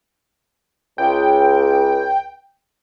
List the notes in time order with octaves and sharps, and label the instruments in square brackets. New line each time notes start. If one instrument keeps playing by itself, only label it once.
[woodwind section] C#2 [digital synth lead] G5